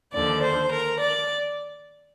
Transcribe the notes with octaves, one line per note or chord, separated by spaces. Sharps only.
D#2 D3 F3 D5
C5
A#4
D5